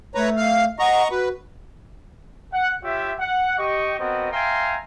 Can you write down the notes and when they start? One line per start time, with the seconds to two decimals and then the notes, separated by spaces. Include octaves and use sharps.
0.15 A3 B4 C#5 A#5
0.37 F5
0.79 D#5 F#5 A#5 C#6
1.10 F#4 B4
2.53 F#5
2.83 F4 G4 C#5 E5
3.18 F#5
3.58 G4 D#5 C#6
3.98 B3 C4 F#4 A#4 D#5
4.32 E5 F5 G5 G#5 A#5 C6